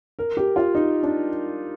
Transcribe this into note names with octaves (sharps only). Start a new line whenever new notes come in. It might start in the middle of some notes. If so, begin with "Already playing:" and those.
A#4
G4
F4
D#4
D4